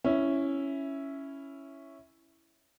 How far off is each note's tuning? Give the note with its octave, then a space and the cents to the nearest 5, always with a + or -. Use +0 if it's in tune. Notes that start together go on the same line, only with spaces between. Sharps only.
C#4 +0 E4 +0